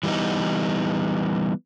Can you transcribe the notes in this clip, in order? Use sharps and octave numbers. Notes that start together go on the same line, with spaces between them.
E3 G3 A#3 B3 D#4